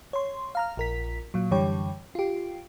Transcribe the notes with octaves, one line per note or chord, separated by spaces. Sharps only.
C#5 C6
F5 A#5 F6
A#1 A#4 B6
A#2 F#3
F#2 D3 E3 G3 C#5 G5
F4 G4